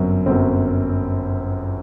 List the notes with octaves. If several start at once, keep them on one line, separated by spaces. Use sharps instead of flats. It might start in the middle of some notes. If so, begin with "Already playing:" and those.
Already playing: G1 F#2 F#3 C4
G1 F#2 F#3 C4